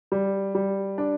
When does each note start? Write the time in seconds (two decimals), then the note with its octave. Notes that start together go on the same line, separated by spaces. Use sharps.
0.12 G3
0.55 G3
0.98 D4